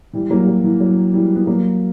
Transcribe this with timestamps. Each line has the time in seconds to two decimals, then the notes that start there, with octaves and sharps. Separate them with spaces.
0.13 E3 G3
0.30 F#3 A#3
0.47 F#3
0.64 E3
0.80 F#3
1.14 E3 G3
1.36 B3
1.47 F#3 A#3